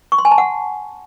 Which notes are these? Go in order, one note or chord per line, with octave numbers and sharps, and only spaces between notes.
C#6
C6
G#5
A5
F#5